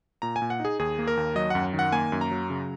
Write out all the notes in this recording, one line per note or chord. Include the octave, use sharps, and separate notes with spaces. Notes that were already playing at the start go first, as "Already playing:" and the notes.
A#2 A#5
G#5
A#2
F#5
D#4 G#4
D#2 G#4
A#3
A#4
D#2
F#3 D#5
F#2 F#5
D#3
F#5
A#3 G#5
F#2
A#5
F#3
C#3